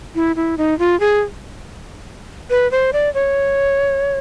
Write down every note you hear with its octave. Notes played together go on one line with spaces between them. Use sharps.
E4
E4
D#4
F4
G#4
B4
C5
D5
C#5